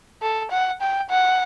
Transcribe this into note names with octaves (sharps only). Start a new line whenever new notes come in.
A4
F#5
G5
F#5